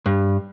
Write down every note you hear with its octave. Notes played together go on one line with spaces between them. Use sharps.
G2